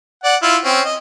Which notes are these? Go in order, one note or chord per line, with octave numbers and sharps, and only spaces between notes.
D5 F#5
E4 F4
C4 C#4
D#5